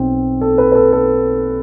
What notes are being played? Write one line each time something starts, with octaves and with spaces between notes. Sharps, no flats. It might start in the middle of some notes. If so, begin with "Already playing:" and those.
Already playing: B1 B2 C4
A4
B4
B4
A4
A4